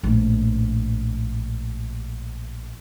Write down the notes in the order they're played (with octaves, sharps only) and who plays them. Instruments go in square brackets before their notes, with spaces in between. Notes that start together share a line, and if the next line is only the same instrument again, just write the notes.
[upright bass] A#1 A2